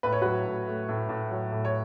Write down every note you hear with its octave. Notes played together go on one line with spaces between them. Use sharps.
A2 B4
C#5
F#3 F#4 B4
A2
A3
A2
A2
F#3
A2
C#5